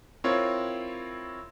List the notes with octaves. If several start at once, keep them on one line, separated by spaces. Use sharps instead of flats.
C4 E4 F4 A#4 C#5